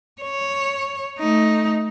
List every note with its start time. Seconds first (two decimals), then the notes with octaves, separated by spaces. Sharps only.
0.22 C#5
1.19 A3 D#4